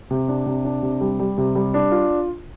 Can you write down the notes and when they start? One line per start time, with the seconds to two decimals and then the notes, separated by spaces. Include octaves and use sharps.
0.11 C3
0.28 D4
0.46 C3
0.65 D4
0.82 C3
1.01 G3
1.19 G3
1.38 C3
1.55 G3
1.74 D4
1.92 F4